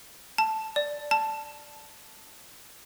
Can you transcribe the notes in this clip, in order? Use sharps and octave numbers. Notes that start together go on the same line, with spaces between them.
A5
D5
A5